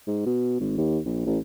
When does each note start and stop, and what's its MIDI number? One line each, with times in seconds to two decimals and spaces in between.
0.07 0.21 44
0.26 0.55 47
0.60 0.76 32
0.78 1.00 39
1.06 1.21 34
1.26 1.39 33